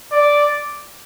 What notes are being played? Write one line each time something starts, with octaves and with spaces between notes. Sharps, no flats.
D5